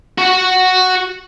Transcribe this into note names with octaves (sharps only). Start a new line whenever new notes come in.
F#4 F#5